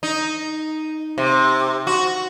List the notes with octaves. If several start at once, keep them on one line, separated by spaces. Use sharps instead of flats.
D#4
C3
F#4